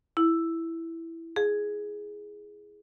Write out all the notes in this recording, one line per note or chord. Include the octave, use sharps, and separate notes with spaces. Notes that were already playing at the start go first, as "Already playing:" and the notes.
E4
G#4